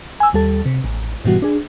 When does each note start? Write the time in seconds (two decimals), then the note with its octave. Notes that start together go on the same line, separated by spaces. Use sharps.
0.20 G#5 E6
0.33 D#2 G3 A4
0.66 C3
0.84 A1
1.25 G#2 B2 E3 G3 F#4
1.42 D4 G#4